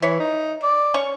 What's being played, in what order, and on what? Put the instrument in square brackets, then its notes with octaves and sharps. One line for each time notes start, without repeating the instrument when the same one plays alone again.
[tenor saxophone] E3 [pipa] C#5 E5
[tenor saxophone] D#4
D5
[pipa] C#4 C#5 C#6